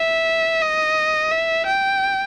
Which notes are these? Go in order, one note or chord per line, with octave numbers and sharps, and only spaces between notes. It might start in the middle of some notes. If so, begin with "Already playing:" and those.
Already playing: E5
D#5
E5
G5